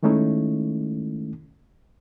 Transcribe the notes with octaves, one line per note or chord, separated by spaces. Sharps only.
D#3 G#3 A3 C#4 D#4 E4